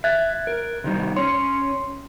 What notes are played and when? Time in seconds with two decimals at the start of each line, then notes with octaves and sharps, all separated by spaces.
0.04 E5 F#6 G#6 A6
0.47 A#4
0.84 C3 D#3 G3
1.16 C#4 C#5 C6